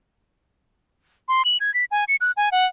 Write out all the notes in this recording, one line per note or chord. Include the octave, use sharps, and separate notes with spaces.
C6
F#7
G#6
B6
G#5
C#7
F#6
G#5
F#5